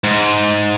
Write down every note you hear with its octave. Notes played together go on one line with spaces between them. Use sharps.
G#2